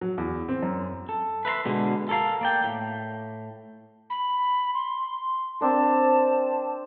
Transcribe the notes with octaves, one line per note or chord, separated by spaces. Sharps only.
F#3
E2
C4
F#2
A4
B4 E5 A#5 C6
B2 D3 G#3
A4 A#4 C#5 F5
A#3 D5 G5
A2
B5
C6
C4 D4 A#4 A5